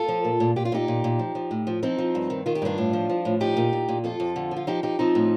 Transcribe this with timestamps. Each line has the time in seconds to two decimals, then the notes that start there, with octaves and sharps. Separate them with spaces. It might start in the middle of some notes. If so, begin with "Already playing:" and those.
Already playing: F4 A4
0.08 F3
0.25 A#2
0.40 A#2
0.56 A#2 G4
0.65 F4
0.72 A#2 D#4 G4
0.88 A#2
1.04 A#2
1.19 F3
1.35 F3
1.51 A2
1.67 F3
1.83 F3 C4 D#4
1.98 F3
2.15 G2
2.30 D#3
2.46 D#3 F4
2.55 G4
2.62 G2 D4 F4
2.78 A2
2.93 F3
3.09 F3
3.25 A2
3.40 F3 D#4 G4
3.57 A#2
3.73 A#2
3.89 A#2
4.04 F2 F4 A4
4.20 F2
4.36 D3
4.51 F3
4.56 F4
4.67 F3 D#4 G4
4.83 F3 D#4 G4
4.99 F3 C4 D#4
5.15 A2